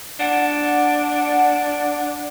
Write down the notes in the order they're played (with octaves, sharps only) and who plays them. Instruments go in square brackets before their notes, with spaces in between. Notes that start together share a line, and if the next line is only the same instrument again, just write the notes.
[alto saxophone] D4 [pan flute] F#5